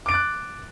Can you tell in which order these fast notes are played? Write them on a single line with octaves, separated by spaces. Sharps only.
D6 D7 A6 F#6